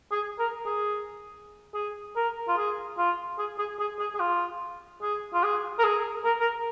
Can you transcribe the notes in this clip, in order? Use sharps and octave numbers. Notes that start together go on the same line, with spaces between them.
G#4
A#4
G#4
G#4
A#4
F4
G#4
F4
G#4
G#4
G#4
G#4
G#4
F4
G#4
F4
G#4
A#4
G#4
A#4
A#4